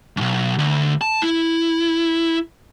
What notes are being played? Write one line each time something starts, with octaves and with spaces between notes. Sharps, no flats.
B1 F#2
D2
A5
E4